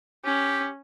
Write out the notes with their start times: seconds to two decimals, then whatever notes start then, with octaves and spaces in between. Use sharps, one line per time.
0.25 C#4 G4